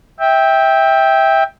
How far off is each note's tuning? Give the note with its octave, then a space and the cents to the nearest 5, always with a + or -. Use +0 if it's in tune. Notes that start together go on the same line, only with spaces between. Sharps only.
E5 -15 G5 +5